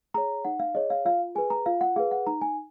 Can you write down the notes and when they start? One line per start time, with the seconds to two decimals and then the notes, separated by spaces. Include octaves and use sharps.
0.14 G#4 C#5 A#5
0.45 D#4 F#5
0.60 F5
0.75 G#4 C#5 D#5
0.90 F5
1.05 F4 F5
1.35 G#4 B4 G#5
1.50 A#5
1.66 F4 F5
1.81 F#5
1.96 G#4 B4 F5
2.11 F#5
2.27 D#4 A#5
2.42 G#5